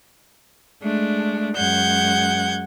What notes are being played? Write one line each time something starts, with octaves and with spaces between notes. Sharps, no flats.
G#3 A3 D4
F#2 G#3 F#5 G6 G#6